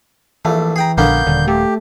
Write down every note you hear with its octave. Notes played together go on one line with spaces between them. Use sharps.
A#1 E3 A3
G#4 G5 A#5
A#1 D3 A#3 B3 C#4 G6
D#1 D3
A3 G4